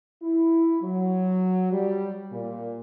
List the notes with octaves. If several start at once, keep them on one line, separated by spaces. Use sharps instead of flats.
E4
F#3
G3
A#2